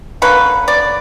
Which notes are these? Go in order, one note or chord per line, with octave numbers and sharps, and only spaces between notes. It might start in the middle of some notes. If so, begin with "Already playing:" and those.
D3 A#3 C#4 B4
D5